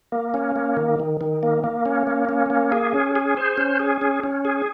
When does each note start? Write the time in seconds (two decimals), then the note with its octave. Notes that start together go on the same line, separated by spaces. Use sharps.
0.12 A#3
0.34 C#4
0.56 A#3
0.77 D#3
1.00 D#3
1.21 D#3
1.43 A#3
1.64 A#3
1.86 C#4
2.07 A#3
2.29 C#4
2.50 A#3
2.72 G#4
2.94 C#4
3.16 G#4
3.37 C5
3.58 C#4
3.79 G#4
4.01 C#4
4.23 C#4
4.45 G#4